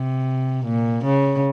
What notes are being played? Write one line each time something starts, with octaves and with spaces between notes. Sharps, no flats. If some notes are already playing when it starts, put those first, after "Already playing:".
Already playing: C3
A#2
C#3